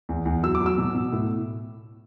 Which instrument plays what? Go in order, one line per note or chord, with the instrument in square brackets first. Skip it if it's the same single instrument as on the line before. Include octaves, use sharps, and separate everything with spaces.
[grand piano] E2
E2
F#3 E6
D6
F#3
E6
B2
B2
A2